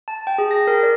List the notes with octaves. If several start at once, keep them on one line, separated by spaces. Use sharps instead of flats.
A5
G5
G#4
A#6
A#4
D5